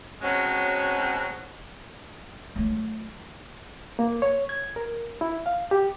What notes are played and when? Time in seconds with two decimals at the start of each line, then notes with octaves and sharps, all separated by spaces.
0.21 B2 F#3 G#3 C4 C#4
2.56 F#3 A3
3.99 A#3
4.22 C#5
4.49 G#6
4.76 A#4
5.21 E4
5.46 F5
5.71 G4